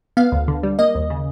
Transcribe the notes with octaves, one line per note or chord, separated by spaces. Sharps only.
B3 F5
D2
D3
G3
A#3 D#5
D#2
C#3